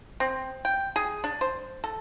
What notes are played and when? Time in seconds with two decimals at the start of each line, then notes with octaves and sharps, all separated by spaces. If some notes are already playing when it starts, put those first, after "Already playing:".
0.20 C4
0.65 G5
0.96 G#4
1.24 D4
1.41 C5
1.84 A4